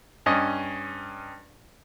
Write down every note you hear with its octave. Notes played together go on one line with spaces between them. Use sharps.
G2 C#4 D#5